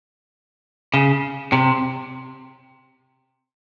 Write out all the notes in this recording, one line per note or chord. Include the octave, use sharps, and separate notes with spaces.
C#3
C3